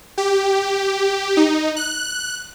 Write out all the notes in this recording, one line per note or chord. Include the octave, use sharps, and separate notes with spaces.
G4
D#4
F#6